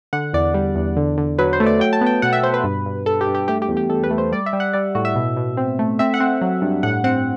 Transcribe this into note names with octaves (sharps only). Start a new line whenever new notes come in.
D3 F#5
E2 D5
G3
E2
D3
D3
F#3 B4
C5
A3
D5
F#3 G5
A5
B3
G5
B2 F#5
E5
B2 C5
B4
G2
G2
G2 A4
G4
G2
G4
A3 G4
G4
E2
G4
E2 A4
B4
A3
C5
G3 D5
E5
G3
F#5
G3 D5
A2 F#4
E5
B2
B2
C4
A3
C4 E5
F#5
C4
F#3
G2
A2 F#5
C4 F#5